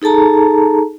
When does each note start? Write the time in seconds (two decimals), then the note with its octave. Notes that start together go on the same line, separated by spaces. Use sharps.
0.02 D#4 G#4 A4 A5 A#5